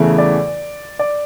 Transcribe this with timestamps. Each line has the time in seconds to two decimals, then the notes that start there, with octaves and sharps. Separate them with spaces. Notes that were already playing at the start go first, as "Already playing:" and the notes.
Already playing: E2 C#3 E3 A3
0.18 D5
0.99 D5